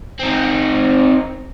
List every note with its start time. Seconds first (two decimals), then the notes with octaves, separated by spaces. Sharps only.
0.20 C4 D#4